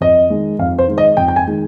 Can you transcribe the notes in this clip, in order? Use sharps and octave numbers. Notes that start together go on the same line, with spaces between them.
F2 D#5
D#3 G#3
F2 F5
C5
D#3 G#3
D#5
F2 G5
G5
G#5
D#3 G#3